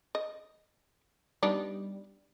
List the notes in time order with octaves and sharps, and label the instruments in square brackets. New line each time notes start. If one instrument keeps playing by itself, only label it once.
[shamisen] D#5
[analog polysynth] G3 [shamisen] B3 D4 D#4